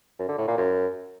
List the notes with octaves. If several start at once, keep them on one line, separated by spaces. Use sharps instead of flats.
F#2
D3
A2
A#2
F#2